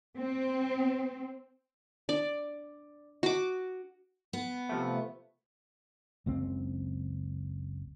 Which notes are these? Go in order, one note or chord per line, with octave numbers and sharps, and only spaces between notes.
C4
D4 D5
F#4 D6
B3
C3 F3 A3
F#1 C#2 C4